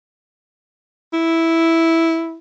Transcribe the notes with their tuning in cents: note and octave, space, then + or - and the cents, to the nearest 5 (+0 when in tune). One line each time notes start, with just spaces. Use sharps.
E4 -5